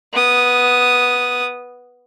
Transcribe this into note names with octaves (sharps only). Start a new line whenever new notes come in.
B3 D#6